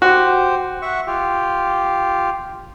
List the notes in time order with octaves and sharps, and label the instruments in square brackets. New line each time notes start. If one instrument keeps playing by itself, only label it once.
[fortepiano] F#4 [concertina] G4 C5
[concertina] E5 F#5 C#6
F4 G4